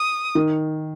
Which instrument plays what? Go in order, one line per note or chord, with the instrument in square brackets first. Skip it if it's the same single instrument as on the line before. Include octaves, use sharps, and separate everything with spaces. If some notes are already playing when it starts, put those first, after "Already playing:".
Already playing: [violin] D#6
[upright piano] D#3